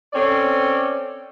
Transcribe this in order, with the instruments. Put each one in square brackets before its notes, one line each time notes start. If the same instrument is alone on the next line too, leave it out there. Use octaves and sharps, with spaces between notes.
[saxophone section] C4 C#4 A4 D5